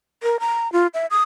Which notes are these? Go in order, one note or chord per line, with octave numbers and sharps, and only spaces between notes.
A#4
A#5
F4
E5
D#6